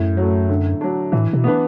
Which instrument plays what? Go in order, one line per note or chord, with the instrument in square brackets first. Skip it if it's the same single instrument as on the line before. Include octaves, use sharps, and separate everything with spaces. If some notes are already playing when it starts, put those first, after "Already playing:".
Already playing: [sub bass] F#2 [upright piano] A2
[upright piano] F#3 A3
D3
F#3 D4
[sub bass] A2 [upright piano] E3
[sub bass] B2
[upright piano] B3 D4 B4